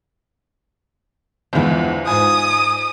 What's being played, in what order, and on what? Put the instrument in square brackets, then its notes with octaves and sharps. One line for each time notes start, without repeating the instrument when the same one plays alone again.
[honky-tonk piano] G1 E2 [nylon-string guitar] F3 G#3 E4
[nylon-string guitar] G#2 F4 [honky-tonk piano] G#5 [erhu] D#6